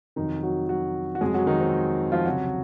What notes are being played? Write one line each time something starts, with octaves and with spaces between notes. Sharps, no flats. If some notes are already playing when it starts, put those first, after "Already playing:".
F2 C3 D#3 F#3 D#4
F#3 F#4
F#3 F#4
F#4
F2 C3 F#3 G#3 G#4
F#3 F#4
D#3 D#4
C4
F3 F4
C#2 C3 F#3 F#4